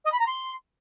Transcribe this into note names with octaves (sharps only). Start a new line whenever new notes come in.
D#5
B5
A#5
C6